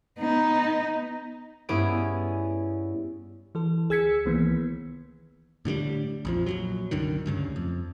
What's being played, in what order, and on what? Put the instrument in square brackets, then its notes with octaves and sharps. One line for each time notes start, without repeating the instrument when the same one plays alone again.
[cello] B3 D#4
[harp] G2 B3 C#4 E4 G#4 D7
[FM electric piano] E3 A4
D2 G#4 E6 G#6 B6 C#7
C2 D#3 E3 A#3 B3
[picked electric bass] A2 D3 F3 G3
A#1 F2 F3
A#1 D#2 F#3
C2 F#2 D3 D#3
D2 G2 C#3
F2